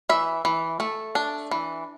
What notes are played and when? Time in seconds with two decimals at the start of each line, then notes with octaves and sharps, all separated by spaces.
0.09 E3 E5
0.45 E3
0.80 A3 A4
1.15 D4
1.51 E3